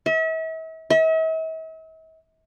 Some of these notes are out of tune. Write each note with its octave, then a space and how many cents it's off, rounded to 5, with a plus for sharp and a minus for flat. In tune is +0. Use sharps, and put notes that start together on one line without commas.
E5 -40
E5 -45